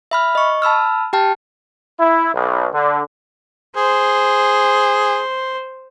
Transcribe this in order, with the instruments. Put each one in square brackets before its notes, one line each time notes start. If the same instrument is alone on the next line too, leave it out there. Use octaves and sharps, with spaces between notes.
[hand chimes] E5 B5 F6
D#5 C#6
A5 B5 E6 F6
G4 G5 A5 F6
[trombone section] E4
B1
D3
[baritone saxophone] G#4 [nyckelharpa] C5